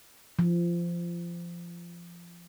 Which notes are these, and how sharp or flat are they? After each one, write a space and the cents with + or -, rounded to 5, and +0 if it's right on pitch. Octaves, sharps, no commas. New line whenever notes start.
F3 -20